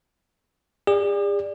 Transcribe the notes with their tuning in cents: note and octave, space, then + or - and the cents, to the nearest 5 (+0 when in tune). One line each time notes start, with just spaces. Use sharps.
G#4 -45 D5 +0